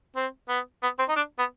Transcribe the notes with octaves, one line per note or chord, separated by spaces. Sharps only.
C4
B3
B3
C4
D#4
D4
B3